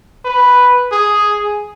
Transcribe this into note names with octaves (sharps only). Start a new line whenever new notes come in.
B4
G#4